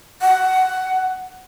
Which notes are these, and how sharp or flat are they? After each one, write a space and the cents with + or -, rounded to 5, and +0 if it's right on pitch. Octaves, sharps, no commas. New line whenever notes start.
F#5 +10